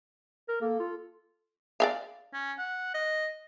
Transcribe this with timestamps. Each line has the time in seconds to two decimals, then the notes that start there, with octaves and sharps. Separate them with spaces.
0.48 A#4
0.62 A#3 A4
0.80 F4
1.80 D5 E5 F5
2.34 C#4
2.59 F#5
2.94 D#5